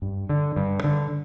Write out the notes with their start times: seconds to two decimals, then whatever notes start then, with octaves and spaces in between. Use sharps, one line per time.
0.02 G2
0.29 D3
0.56 G2
0.84 D3